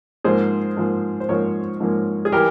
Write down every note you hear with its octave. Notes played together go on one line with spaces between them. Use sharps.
G#2 F3 A#3 G#4 C5
G#2 F3 A#3
C5
G#2 F3 A#3 A#4 C#5
G#2 F3 A#3
G#4
E3 G3 G4 A#4